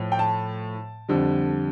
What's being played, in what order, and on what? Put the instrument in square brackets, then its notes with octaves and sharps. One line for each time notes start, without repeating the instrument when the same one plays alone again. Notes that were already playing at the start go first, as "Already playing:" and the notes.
Already playing: [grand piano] A2 F3
G5
A5
F2 D3 G3